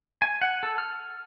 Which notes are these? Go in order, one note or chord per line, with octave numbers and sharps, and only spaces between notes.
G#5
F#5
A4
F6